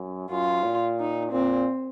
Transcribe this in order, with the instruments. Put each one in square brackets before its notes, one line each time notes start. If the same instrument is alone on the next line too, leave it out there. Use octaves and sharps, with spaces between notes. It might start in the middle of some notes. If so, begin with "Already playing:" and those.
Already playing: [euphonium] F#2
[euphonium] F#2 [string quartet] F4
[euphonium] A#2
[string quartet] D#4
[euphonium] A#2 [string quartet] C4